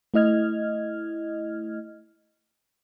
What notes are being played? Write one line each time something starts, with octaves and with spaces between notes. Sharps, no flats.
A3 E4 D#5 F6 G#6